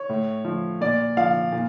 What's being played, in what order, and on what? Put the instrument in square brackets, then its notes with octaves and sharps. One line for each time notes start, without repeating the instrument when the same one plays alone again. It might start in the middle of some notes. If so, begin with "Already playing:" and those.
Already playing: [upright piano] C#5
A2
F3
A#2 D5
F3 F5
A#2